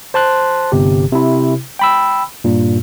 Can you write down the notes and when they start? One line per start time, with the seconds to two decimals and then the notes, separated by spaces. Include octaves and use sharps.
0.14 C5 A5 C6 F#6
0.72 G1 C3 G4
1.12 C3 E4
1.79 G5 B5 E6
2.44 G2 A#2